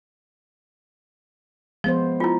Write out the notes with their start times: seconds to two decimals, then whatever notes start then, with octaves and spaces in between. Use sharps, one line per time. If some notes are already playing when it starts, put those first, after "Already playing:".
1.84 F3 G#3 B3 C5
2.20 E4 F4